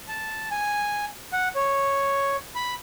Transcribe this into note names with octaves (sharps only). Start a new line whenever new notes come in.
A5
G#5
F#5
C#5
B5